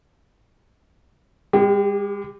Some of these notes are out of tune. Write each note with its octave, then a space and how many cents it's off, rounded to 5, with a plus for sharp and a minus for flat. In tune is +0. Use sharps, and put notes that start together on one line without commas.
G#3 -45 G4 +0